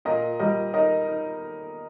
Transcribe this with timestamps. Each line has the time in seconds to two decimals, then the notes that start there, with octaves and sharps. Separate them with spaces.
0.05 A#2 A#4 D#5
0.39 G3 A#4 D#5
0.73 D#4 A#4 D#5
1.08 D#4